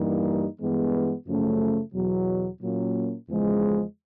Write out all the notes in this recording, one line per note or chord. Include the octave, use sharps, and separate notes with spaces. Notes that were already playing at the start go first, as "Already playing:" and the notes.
Already playing: G2 E3 G3 A#3 D#4
G2 E3 G#3 B3
F#2 C#3 F3 A3 C#4
E2 B2 F#3
A#2 F#3 A#3 C#4
E2 C#3 F3 G#3